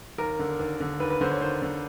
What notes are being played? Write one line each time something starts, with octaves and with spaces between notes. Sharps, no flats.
D#2 A#4
D3
D#2
D3
D#2 B4
B4
D3 C5
C#5
D#2 C5
D3